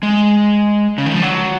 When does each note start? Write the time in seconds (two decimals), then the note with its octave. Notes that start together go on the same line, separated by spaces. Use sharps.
0.03 G#3
0.98 C#3
1.06 D#3
1.14 F3
1.22 F#3